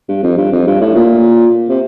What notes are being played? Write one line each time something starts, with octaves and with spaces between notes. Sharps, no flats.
G2
F2
G2
F2
G2
A2
A#2
C3